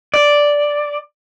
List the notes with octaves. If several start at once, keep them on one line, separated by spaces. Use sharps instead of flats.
D5